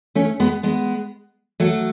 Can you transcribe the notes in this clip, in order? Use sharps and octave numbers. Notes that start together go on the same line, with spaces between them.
A3 C#4
G#3 B3
G#3 B3
F#3 A3